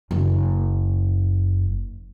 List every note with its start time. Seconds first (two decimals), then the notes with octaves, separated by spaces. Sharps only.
0.11 F#1 F#2